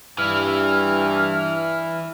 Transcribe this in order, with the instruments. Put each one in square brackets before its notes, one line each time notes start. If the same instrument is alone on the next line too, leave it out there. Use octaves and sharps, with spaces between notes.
[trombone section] G2 [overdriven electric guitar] E3 E4 [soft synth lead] F6